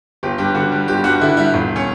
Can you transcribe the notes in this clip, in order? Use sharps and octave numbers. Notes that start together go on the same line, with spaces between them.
G1 G4
G2 G4
D3 F#4
G3
G1 G4
G2 F#4
D3 E4
G3 E4
E1
C#4